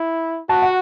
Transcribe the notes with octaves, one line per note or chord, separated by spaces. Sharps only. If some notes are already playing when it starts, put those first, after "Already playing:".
Already playing: E4
F#4 A5
F#5